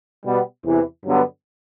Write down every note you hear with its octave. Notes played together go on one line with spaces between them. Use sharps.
B2 G3 B3
E2 C3 E3
G2 D3 F#3 B3